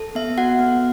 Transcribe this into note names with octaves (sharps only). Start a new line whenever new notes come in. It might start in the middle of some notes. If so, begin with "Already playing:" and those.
Already playing: A4
B3 E5
F#4 F#5
B3